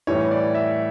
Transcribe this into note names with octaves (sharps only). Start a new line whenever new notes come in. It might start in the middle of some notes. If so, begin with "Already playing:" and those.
A2 E3 G3 C#5
D5
E5